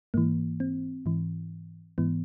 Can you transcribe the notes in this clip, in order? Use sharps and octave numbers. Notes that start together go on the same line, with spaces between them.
G#2 E3 A#3
C4
G#2 E3
G#2 E3 B3